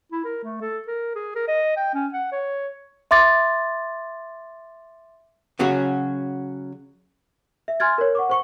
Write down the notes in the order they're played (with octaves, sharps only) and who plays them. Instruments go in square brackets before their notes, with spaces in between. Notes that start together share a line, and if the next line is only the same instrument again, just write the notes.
[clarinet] E4
A#4
A3
A4
A#4
G#4
A#4
D#5
G5
C#4
F#5
C#5
[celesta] E5 C6 D6 A6
[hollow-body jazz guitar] C#3 F#3 C#4 F#4 G#4
[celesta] E5
G#5 C6 F6 G#6 A6
A#4 C#5
F#5 C#6 D6
C5 C#6 C#7